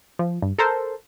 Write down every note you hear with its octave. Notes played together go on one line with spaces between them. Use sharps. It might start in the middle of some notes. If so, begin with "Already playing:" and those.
F3
G2
A4 A#4 C5